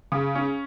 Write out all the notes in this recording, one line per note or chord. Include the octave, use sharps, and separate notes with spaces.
C#3
C#4